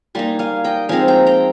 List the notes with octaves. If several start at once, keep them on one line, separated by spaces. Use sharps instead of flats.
G3 A#3 D#4 G#5 C6
F5 G#5
D#5 G5
F3 G#3 C4 D#4 F5 G#5
G5 A#5
G5 A#5